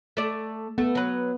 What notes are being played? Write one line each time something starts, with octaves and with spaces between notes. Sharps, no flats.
A3 D5
A3 B3
F#3 B4